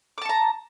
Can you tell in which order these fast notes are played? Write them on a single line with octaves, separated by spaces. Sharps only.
D6 A5 C#6 A#5